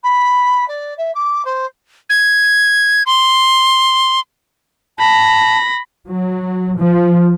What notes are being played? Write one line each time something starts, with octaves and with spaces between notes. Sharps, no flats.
B5
D5
E5
D6
C5
G#6
C6
A5 B5 A#6
F#3
F3